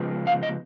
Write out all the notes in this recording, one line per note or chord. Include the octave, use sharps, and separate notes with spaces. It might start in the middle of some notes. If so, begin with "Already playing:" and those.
Already playing: C#3 F3 G#3 B3
F5
D#5